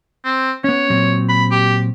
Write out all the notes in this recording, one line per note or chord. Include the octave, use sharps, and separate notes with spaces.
C4
B3 C#4 C#5
A#2 F#3 C4
B5
G4